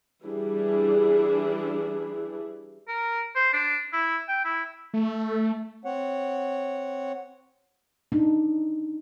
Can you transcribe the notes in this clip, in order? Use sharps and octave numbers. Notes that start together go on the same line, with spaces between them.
E3 G3 D4 E4 G#4
A#4
C5
D4
E4
G5
E4
A3
C4 C#5 F#5
D4 D#4